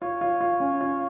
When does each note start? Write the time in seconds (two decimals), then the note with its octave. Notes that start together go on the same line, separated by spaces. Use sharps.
0.02 F4 C#5
0.21 F4
0.41 F4
0.60 C#4
0.81 F4